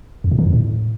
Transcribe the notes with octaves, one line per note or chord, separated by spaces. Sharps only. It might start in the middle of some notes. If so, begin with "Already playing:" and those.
E2
A#2
D#3
E2
A2